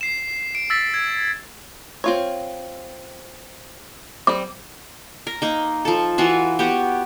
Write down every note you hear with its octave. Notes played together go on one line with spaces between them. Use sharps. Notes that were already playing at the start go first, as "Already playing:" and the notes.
C7 E7
D7
E6 A6 B6
G#6
C4 F4 C#5
G3 C4 D6
A#4
A#3 D#4
F3 A4
E3 F4 F#4
B3 F#4 G4